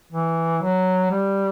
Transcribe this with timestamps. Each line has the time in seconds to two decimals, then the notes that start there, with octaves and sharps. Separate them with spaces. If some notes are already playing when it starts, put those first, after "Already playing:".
0.13 E3
0.62 F#3
1.11 G3